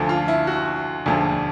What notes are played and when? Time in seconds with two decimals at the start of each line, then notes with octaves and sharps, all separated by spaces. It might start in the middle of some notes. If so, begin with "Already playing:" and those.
Already playing: D2 D3 F3
0.09 F4
0.28 E4
0.47 F#4
1.06 E1 D2 D3 F3